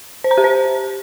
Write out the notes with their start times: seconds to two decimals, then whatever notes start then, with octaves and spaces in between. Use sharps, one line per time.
0.24 C5
0.31 A#5
0.38 G4
0.44 C5